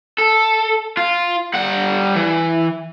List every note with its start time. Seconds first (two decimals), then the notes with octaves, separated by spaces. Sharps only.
0.18 A4
0.97 F4
1.54 G3 F#5
2.16 E3